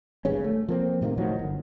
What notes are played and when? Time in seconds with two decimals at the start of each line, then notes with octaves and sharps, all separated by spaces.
0.25 G#1 G2 C#3 C#4
0.44 A3
0.68 F3 A#3 C4
1.01 A2 C3 D#3 A#3
1.17 A2 D#3 F3 F#3
1.39 G1